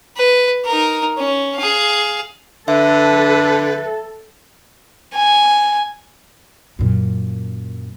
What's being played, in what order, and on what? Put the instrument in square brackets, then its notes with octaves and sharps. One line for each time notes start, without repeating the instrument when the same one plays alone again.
[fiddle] B4
D#4 A#4
C#4
G#4 F5
[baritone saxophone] D3 [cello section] A4 [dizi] B4 [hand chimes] E5
[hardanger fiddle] G#5
[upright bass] F#2 A#2